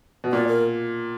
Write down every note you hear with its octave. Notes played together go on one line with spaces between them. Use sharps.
B2
A#2 D5
A#4